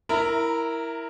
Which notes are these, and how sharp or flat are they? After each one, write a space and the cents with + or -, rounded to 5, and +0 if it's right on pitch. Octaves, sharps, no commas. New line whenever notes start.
E4 +0 A#4 +0 A#5 -25